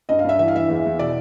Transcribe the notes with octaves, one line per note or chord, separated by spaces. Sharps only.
G2 D#5
F5
G2 E5
E3 E5
F5
E3 E5
E2
E2
B2 D5